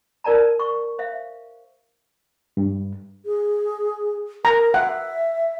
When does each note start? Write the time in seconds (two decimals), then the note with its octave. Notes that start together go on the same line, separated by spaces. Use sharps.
0.24 D#4 A#4 D5 A5 A#5
0.60 C#6
0.99 C5 E5 F5
2.57 G2
3.26 G#4
4.45 A#4 A#5
4.74 E5 F#5